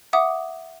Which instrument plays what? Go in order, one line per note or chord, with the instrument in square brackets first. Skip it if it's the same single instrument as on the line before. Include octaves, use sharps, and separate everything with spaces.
[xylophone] E5 F#5 D6 D#6